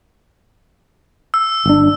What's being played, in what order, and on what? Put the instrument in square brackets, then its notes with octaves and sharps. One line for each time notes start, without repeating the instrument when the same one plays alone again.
[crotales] E6
[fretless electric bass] G1 D4